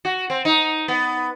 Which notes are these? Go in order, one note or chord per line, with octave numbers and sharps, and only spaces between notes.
F#4
C4
D#4
B3